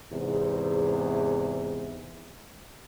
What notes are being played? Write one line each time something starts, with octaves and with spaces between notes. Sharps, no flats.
E2 G#2 C3